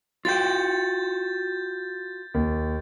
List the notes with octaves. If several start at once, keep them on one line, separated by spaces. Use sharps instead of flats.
F4 F#4 G5 G6 A6
D#2